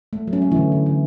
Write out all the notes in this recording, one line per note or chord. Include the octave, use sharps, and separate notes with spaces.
A3
F#3
C#4
A3
D3 E3 E4
D3
D3